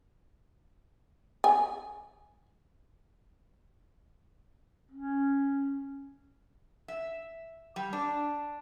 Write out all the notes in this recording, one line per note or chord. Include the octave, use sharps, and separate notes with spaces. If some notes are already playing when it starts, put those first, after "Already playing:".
G#5
C#4
E5
G3
D4